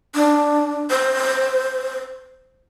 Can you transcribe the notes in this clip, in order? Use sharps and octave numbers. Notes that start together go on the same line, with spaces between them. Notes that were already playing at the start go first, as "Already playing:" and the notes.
D4
C5